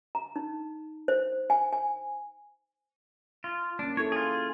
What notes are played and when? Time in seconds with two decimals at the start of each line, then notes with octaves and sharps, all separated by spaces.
0.15 A#5
0.36 D#4
1.08 C5
1.50 G#5
1.73 G#5
3.44 F4
3.79 A#3 C#4 D4
3.97 E4 A4 C#5
4.12 F4 G#4